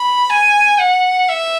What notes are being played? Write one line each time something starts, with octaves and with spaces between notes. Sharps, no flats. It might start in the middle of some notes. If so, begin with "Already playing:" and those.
Already playing: B5
G#5
F#5
E5